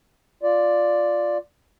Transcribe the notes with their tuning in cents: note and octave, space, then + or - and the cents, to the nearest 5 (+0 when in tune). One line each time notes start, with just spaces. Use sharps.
F4 +0 D5 +0